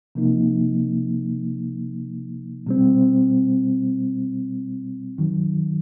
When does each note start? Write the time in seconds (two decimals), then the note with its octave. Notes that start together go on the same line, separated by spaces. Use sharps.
0.15 C3 F3 A#3 D#4
2.66 B2 G3 C4
5.17 G2 D#3 F#3